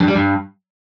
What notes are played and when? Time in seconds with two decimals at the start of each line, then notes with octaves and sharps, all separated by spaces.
0.01 G2
0.08 G3
0.15 G2